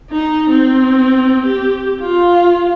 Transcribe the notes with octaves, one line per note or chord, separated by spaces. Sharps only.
D#4
C4
G4
F4